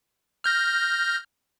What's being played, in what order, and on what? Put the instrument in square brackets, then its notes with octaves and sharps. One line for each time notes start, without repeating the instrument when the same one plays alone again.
[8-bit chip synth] F6 G6 A#6